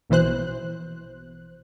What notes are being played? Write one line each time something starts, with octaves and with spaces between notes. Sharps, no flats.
A#1 B2 E3 C5 F#6